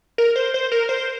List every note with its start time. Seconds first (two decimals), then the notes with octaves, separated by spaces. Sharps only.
0.18 A#4
0.36 C5
0.54 C5
0.72 A#4
0.89 C5